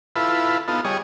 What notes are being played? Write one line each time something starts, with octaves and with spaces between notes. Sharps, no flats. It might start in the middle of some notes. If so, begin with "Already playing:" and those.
E4 F4 A4 B4
B3 D#4 F4 A4
G3 G#4 C#5 D#5